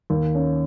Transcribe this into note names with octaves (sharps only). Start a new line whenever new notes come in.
D#2
C#4